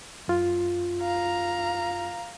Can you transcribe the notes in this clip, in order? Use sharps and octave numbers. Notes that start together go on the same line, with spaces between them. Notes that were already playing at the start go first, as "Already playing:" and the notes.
F#2 F4
F5 A#5